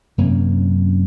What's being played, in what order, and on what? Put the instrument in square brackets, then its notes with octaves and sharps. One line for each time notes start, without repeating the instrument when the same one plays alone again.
[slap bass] F#2 C3 A#3 C#4